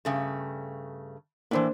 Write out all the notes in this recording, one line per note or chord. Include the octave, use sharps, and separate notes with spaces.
G2 C#3 A3
A2 C#3 E3 A#3 D4 C5